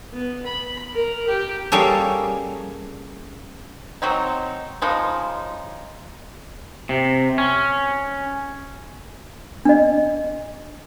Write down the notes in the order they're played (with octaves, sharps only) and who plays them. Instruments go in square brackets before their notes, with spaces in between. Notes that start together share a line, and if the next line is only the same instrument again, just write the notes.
[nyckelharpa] B3
B5
A#4
G4
[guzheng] G3 A#3 C#4 G#4 A4
[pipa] F#3 C4 D#4
C#3 F3 G#3 D#4
[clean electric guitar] C3
C#4
[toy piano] D4 D#5